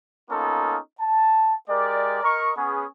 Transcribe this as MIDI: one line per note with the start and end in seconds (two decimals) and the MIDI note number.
0.30 0.77 58
0.30 0.77 59
0.30 0.77 61
0.30 0.77 63
0.30 0.77 65
0.30 0.77 69
1.01 1.54 81
1.69 2.21 56
1.69 2.21 67
1.69 2.21 70
1.69 2.21 74
2.23 2.52 70
2.23 2.52 75
2.23 2.52 85
2.57 2.85 59
2.57 2.85 61
2.57 2.85 68